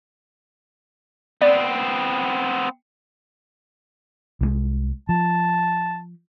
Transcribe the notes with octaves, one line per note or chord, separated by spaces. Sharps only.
B3 C4 D5
C2 E3 G#3
F3 A5